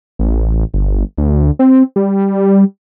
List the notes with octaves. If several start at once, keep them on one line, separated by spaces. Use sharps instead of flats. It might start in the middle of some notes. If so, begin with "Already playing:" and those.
A1
G1
D2
C4
G3